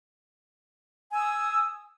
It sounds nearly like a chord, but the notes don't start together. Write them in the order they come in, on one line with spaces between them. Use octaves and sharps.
G#5 E6 D#6